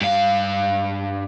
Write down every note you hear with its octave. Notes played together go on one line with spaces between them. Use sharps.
G2 F5